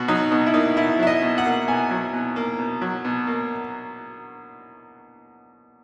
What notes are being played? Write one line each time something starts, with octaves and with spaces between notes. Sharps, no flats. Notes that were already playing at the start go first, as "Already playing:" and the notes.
Already playing: B2 F#4
F#3 D#4
B2 D#4
E4
A#3 D#4
B2 E4
F#3 E5
D#5
B2
F#5
A#3
B2 G#5
F#3
B2
A#3
B2
F#3
B2
A#3